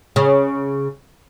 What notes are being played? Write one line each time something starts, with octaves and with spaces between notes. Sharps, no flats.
C#3